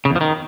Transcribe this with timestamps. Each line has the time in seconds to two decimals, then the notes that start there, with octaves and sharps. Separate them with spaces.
0.05 C#3
0.10 E2
0.16 F3
0.21 D#3